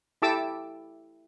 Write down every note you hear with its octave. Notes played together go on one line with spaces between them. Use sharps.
E4 G4 A4 A5 D6 E6